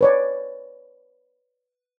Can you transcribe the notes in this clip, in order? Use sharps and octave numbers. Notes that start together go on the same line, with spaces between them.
B4 C#5 D5